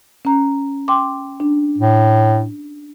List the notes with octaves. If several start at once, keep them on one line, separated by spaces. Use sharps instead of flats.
C#4 A#5
G5 C6 D6
D4
A2